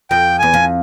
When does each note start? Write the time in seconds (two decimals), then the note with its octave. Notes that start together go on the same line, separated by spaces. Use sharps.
0.11 F2 G5
0.39 E2 G#5
0.54 F2